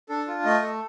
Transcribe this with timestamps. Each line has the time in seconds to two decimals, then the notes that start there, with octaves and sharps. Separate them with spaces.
0.09 D4 A4
0.28 F4
0.45 A3 D#5
0.62 A4